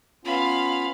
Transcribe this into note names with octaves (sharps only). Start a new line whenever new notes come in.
B3 C#4 F4 F5 B5